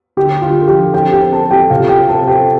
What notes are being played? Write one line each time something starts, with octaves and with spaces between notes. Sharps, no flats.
D3 G4
D3 F4
A4
F3 G4
C4 G4 G5
G4 G5
C4
A4 A5
C4
G4 G5
C3 F4 F5
G4 G5
C4
A4 A5
C4
G4 G5